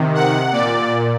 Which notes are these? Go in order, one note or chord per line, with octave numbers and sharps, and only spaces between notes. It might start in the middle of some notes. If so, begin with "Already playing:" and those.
Already playing: C3 D#3
F#5
A#2 D5